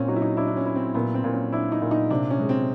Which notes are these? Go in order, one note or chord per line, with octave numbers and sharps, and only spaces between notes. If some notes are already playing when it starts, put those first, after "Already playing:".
Already playing: A#2 C4 C#4
F#3 D#4
E4
D#4
D4 E4
D4
C#4
E4
C4
A#2 B3
C4
A#2
C#4
D4 E4
D#4
A#2
D#4
C3 D4
C#4
G#3
C4